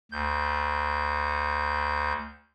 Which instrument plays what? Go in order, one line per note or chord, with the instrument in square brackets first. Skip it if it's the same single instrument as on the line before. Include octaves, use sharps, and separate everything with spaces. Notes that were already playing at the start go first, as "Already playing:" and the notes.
[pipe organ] D2 G6